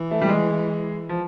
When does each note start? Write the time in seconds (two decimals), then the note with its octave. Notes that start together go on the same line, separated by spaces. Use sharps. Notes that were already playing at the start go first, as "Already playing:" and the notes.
Already playing: E3
0.11 A3
0.22 G3
0.29 G#3
1.09 F3